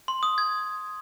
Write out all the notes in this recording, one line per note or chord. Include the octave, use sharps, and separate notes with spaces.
C6
D#6
G#6